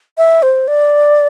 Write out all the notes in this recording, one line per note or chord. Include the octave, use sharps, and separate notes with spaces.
E5
C5
D5